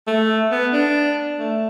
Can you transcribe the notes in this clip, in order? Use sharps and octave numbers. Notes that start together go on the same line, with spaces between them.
A3
B3
D4
A3